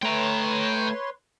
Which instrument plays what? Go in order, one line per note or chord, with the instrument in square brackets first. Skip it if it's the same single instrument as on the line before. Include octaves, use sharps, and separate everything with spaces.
[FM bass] A3 [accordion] B4 C#5 C6 [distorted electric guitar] G5 A#5